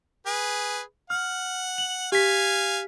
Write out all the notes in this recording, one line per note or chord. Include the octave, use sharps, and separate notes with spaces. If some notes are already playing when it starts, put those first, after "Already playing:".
G#4 B4
F#5 F6
F#7
G4 F5 G#5 B6